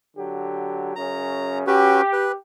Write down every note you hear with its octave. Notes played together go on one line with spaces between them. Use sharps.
D3 F#3 G4
F#2 C#3 C#4 A#5
C#4 F#4 G4 B4
B4